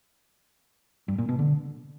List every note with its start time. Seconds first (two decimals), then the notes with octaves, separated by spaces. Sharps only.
1.08 G2
1.18 A#2
1.29 B2
1.39 D3